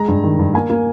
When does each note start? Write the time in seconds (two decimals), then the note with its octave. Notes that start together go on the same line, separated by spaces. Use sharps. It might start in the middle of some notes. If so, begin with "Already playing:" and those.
Already playing: G#3 A#5
0.08 G2
0.24 D#3
0.39 G2
0.54 A#3 G#5
0.70 A#3